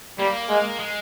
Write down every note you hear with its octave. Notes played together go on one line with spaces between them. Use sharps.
G3 A#3
G#3
G#3